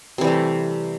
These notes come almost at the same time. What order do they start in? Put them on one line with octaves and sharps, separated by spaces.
C3 E3 G3 A3